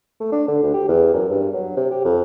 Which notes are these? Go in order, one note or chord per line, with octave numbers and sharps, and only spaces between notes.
A3
D4
D3
D2
G4
E2
F#2
G2
F#3
C3
G4
F2